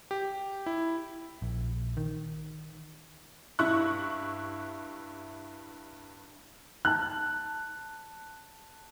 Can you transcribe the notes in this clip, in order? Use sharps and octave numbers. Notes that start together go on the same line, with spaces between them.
G4
E4
A#1
D#3
G2 E4 C#6 F#6
A5 F#6